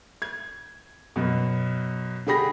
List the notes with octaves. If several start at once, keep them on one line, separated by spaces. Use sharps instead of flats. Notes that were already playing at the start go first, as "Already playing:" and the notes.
G#6
F#2 B2
D3 G4 G#4 B5 A#6